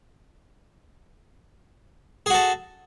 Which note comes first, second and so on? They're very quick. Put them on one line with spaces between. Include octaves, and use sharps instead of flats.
G#4 F#4 A4